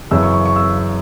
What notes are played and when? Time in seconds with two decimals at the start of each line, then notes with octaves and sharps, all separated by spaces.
0.11 F#2 C#3 E3 E6
0.23 C#6
0.34 C#6
0.45 C#6
0.56 E6